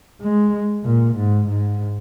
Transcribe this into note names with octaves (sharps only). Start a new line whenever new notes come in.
G#3
A#2
G#2
G#2